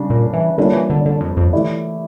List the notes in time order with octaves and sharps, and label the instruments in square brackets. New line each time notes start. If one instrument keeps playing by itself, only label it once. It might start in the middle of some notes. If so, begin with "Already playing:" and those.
Already playing: [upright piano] C#3 G3 D4
[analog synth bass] A#2
E3
[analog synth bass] D3 [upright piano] G3 A#3 D4 F4 C#5
[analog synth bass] E3
D3
D3
F2
F2
[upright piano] E3 A3 E4 G4 D5